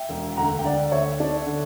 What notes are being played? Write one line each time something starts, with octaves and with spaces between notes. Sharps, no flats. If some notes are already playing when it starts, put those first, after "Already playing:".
Already playing: E5 G5
E1
D2 F#5 A#5
G5
D3 D5 F#5
D2 C#5 E5
D4
D3